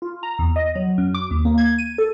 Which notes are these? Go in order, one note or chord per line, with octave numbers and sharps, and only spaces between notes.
F4
A#5
E2
D#5
F#3
F#2
D6
D#2
A#3
G#6
D#7
A4